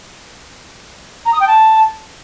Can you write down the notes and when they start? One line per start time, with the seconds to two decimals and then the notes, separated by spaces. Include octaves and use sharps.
1.25 A#5
1.33 D#6
1.40 G5
1.47 A5